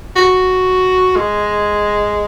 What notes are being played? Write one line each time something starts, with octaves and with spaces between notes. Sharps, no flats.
F#4
G#3